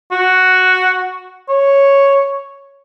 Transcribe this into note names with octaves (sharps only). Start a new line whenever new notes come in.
F#4
C#5